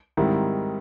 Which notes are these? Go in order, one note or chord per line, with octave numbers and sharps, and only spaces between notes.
G#2 D#3 G3 C4 E4